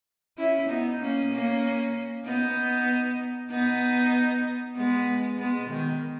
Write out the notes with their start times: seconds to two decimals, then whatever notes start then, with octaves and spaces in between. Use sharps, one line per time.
0.37 C#4 E4
0.69 B3 D#4
1.00 A#3 C#4
1.31 A#3 C#4
2.25 B3 D#4
3.50 B3 D#4
4.75 G#3 B3
5.38 G#3 B3
5.70 D#3